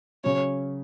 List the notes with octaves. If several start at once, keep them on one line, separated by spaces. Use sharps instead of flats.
C#3 F#3 C#4 C#5